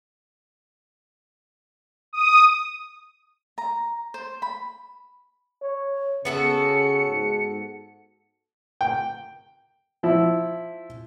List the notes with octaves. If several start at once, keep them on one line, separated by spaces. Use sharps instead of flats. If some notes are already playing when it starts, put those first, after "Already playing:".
D#6
A#5
C5
B5
C#5
C#3 B3 F#4 A4 C#7
G#2
G5
F3 E4